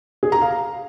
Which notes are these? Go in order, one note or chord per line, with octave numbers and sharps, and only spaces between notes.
G#4
A#5
F5